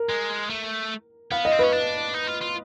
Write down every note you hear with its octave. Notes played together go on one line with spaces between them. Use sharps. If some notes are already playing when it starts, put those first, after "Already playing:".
Already playing: A#4
G#3
A3
B3 F5
D#5
C4
C#4 B4
D4
D#4
F4
F4